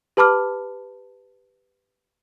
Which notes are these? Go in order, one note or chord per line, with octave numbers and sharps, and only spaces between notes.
G4 B4 A5 B5 D6 F6